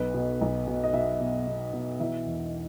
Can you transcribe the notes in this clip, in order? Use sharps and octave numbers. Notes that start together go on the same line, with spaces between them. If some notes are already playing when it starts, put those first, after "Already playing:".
Already playing: B1 B4
B2
B1
B2
D#5
B2 E5
B2
B2
B2
E3 E5
E1